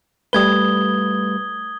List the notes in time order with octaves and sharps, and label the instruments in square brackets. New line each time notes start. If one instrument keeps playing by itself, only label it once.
[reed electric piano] G3 A3 B4 [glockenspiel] D#6 G#6 G7